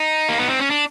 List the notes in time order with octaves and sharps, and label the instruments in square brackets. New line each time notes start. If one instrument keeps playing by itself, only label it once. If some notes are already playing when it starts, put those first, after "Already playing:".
Already playing: [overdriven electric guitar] D#4
A#3
B3
C4
C#4
D4